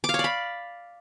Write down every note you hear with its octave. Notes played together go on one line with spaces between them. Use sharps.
D6
F5
C#5
D5
B5